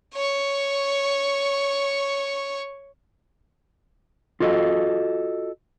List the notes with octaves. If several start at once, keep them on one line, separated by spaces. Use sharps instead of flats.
C#5 C#6
F4 F#4 A4 D#5